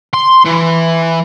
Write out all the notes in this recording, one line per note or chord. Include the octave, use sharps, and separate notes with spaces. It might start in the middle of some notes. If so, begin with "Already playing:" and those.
C6
E3